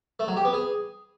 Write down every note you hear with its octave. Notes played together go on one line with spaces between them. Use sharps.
A3
F#3
G4
B3
G#4